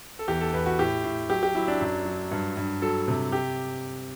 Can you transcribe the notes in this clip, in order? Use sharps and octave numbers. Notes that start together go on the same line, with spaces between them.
A4
E2 G4
A4
E2 B4
F#4
A2 G4
A2
F#3 G4
G4
F#3 E4
D4
F#2
F#3
G2
G2
F#3 A4
C3
G4